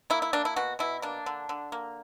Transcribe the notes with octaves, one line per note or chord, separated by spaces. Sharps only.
A#3 E4
E4
A#3 D4
E4
B2 F#4
B2 E4
A#3 D4
D3
D3
A#3